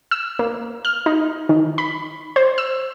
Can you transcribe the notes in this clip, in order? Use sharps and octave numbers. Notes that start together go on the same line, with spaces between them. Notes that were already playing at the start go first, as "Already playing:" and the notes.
E6
A#3
F6
D#4
D#3
B5
C5
E6